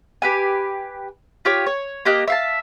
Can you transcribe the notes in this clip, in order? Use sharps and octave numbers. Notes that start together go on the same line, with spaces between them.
G4 B4 G#5
F4 G4 C#5
C#5
A#3 G4 D#5 F#6
E5 F5 A5